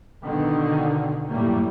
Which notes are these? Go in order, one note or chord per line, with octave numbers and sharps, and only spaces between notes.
B2 D3 D#3
F#2 A2 G3 A3 A#3